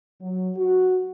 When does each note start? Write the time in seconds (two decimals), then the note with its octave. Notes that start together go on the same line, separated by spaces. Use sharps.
0.20 F#3
0.57 F#4